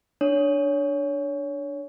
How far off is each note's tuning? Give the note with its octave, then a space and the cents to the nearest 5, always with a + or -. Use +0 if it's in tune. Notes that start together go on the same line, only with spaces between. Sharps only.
D4 +0 C#5 +20